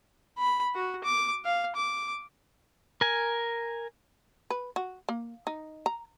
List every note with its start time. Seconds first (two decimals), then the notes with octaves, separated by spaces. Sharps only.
0.38 B5
0.75 F#4
1.04 D6
1.45 F5
1.76 D6
3.01 A#4 G#5
4.50 B4
4.76 F#4
5.09 A#3
5.47 D#4
5.86 A#5